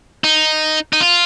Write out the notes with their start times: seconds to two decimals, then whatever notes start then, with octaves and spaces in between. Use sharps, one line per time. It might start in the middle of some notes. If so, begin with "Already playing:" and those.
0.24 D#4
0.93 D#4
1.01 F4